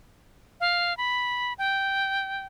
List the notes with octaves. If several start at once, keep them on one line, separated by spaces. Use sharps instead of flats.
F5
B5
G5